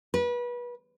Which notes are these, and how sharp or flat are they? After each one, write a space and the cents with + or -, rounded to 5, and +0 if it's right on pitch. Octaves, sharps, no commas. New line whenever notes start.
B4 -30